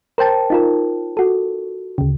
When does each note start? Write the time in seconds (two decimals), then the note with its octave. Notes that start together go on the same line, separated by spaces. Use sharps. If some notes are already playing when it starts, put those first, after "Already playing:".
0.18 A#4 C5 G5 A5
0.50 D#4 F4 A#4
1.17 F#4 A4
1.98 D2 C#3